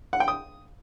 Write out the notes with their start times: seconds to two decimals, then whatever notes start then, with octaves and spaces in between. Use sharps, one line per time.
0.13 F#5
0.20 G5
0.28 D#6